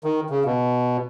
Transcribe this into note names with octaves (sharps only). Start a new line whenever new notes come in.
D#3
C#3
B2